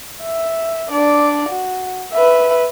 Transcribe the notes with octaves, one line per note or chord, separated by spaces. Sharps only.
E5
D4 D5
F#4
B4 E5